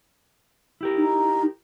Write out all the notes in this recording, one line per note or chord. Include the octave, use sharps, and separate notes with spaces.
E4 G4 A#4
D#4